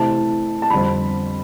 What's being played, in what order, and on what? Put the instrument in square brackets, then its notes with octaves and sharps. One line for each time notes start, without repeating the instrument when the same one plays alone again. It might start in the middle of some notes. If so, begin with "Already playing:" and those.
Already playing: [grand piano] C3 E3 A3 C4 E4 A5
A5
F2 D3 G3 C4 B5